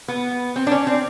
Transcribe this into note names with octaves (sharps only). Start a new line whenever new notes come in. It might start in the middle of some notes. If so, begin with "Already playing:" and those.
B3
C4
D4
C#4
C4